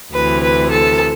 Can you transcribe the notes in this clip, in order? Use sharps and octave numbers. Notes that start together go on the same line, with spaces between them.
D2 C3 E3 B4
B4
A4